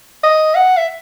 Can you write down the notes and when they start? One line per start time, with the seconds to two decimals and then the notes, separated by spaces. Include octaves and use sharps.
0.23 D#5
0.55 F#5
0.77 E5